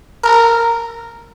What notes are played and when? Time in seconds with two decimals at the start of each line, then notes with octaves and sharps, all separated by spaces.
0.23 A#4